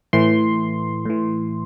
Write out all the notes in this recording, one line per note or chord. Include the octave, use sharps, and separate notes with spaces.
A2 E3 C6
A2 E3